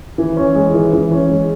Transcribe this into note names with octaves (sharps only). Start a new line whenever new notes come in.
E3
C#4
G#3
E3
E3
C#4
G#3